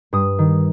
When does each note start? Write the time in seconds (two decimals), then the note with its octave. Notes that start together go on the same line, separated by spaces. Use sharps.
0.13 G2 D#6
0.39 D#3